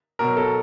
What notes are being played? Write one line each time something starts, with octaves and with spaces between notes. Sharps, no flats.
B2 F#3 A#4
A4